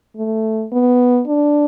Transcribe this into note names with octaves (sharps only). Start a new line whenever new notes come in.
A3
B3
D4